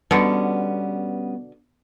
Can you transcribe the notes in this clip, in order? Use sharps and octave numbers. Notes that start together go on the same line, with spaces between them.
B2 D3 G3 B3 C#4